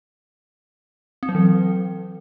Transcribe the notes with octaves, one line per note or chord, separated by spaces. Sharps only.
C4
F#3
E3